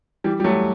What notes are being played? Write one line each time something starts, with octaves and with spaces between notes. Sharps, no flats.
E3 G3
G3
F#3 A3